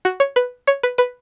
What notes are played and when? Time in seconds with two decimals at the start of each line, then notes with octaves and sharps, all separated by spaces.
0.05 F#4
0.20 C#5
0.36 B4
0.67 C#5
0.83 B4
0.98 B4